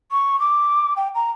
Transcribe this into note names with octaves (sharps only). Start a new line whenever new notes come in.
C#6
D6
G5
A#5